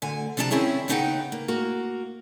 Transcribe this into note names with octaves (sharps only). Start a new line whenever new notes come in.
D2 D3 G#5
C3 F3 D4 F#5 A5 A#5
D#3 C4 C#4 E4 G#4 C#5
D#2 C#3 B3 D#4 F#5 G5
A#3
A#3 F#4 A#4